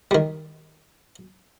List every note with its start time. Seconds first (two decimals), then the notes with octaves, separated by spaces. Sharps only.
0.11 D#3 G3